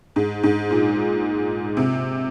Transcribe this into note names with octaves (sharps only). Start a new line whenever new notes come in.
G#2
G#2
A#2
C3